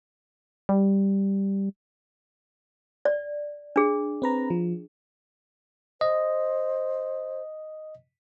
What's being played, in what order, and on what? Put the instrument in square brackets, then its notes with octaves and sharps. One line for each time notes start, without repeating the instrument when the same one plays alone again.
[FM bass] G3
[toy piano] D5
D4 G#4
[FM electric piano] C4 B4 A#5
F3
[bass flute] C5 [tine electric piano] D#5